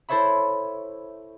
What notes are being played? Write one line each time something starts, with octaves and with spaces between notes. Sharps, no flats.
E4 A4 C5 C#5 E5 B5